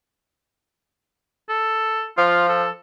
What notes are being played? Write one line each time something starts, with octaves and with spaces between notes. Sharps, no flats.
A4
F3 F4
A4